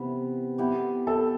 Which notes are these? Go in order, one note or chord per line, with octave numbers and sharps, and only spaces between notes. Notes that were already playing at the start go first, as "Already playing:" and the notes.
Already playing: C3 E3 B3
B3 E4 G4
A4